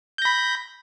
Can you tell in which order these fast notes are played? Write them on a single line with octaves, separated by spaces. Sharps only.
G6 A#6 B5